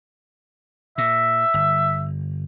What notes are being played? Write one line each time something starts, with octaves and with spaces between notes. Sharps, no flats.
A#2 E5
G1